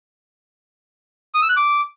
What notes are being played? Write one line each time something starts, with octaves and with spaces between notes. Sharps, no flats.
D#6
E6
F#6
D6